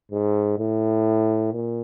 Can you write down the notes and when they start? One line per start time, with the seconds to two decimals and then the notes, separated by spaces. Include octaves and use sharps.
0.12 G#2
0.59 A2
1.53 A#2